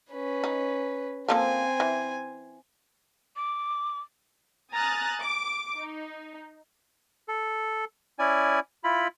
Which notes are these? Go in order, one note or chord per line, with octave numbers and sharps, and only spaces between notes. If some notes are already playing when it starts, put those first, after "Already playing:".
C#4 B4
D#4
F3 A#3 C4 A4 G#5
E3
D6
G#5 A#5 D#6 F6 F#6 A6
D6
D#4
A4
C#4 E4 D5 G#5
E4 F4 B5